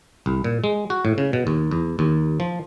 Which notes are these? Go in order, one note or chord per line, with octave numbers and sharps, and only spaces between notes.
C2
A#2
G#3
F#4
A2
C#3
B2
D#2
E2
D#2
F3